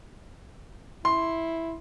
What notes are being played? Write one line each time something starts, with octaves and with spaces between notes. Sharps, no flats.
E4 C6